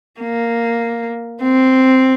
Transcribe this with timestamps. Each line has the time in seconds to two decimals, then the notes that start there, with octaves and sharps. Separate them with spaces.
0.21 A#3
1.43 C4